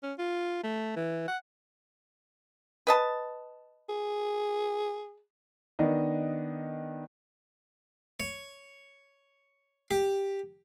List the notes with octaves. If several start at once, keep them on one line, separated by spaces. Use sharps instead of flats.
C#4
F4
A3
E3
F#5
B4 D#5 A5
G#4
D#3 B3 D4 D#5
C#5
G4